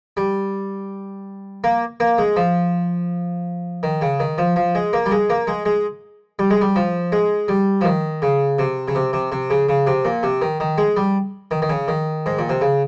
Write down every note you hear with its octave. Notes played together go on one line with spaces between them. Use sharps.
G3
A#3
A#3
G#3
F3
D#3
C#3
D#3
F3
F3
G#3
A#3
G3
G#3
A#3
G#3
G#3
G3
G#3
G3
F3
G#3
G3
F3
D#3
C#3
C3
C#3
C3
C3
C3
C#3
C#3
C3
A#2
C3
D#3
D#3
G#3
G3
D#3
D#3
C#3
D#3
G#2
A#2
C3
C#3